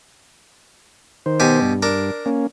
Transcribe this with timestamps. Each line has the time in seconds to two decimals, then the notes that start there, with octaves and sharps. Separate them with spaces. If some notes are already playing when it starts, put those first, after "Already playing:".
1.26 D#3 C5
1.40 B2 G4 G#5
1.62 G2
1.83 D4 A#4
2.26 A#3 C#4